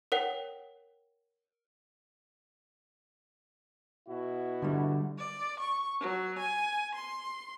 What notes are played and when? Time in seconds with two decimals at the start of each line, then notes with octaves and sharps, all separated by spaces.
0.12 A#4 C#5 F#5 G5
4.08 B2 E4 F#4
4.62 D3 G3 A3
5.18 D5
5.60 C#6
6.00 F#3
6.39 G#5
6.95 C6